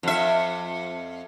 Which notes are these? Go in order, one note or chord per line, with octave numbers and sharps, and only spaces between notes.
F2 E5